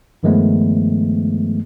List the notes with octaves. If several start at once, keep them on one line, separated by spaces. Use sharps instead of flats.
G2 D#3 F3 G#3 A3 B3